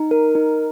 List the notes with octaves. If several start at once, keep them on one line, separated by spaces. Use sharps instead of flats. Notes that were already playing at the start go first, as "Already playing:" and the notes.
Already playing: D#4
A#4
D#4